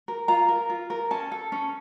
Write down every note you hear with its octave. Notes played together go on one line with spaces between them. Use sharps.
A#4
F4 A#5
A#4
F4
A#4
C#4 A5
A4
C#4